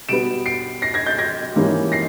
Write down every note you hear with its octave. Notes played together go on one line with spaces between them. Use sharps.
B2 G3 B3 D7 E7
C7 D7
A#6 C7
G#6 A#6
G6 A6
G#6 A#6
G#2 E3 G3 A#3 C#4
A#6 C7